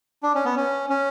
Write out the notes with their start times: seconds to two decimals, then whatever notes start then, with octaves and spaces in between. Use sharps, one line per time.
0.23 D4
0.35 C#4
0.45 B3
0.56 C#4
0.90 C#4